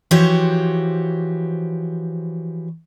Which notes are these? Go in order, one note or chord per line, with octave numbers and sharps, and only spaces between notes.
E3 F3 F#4 G4 C5 C#5